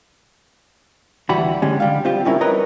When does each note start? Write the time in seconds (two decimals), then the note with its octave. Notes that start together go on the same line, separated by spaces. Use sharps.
1.29 D2 E3 G3 F#4 B5
1.62 D3 G3 G#3 C#4
1.80 D3 G3 F5
2.05 C4 F4 G4
2.25 G3 C#4 E4 A#4
2.41 A#4 B4 C#5 D#5 A#5